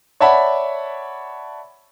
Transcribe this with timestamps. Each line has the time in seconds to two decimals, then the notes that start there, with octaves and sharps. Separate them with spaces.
0.20 C#5 D5 E5 F#5 A5 B5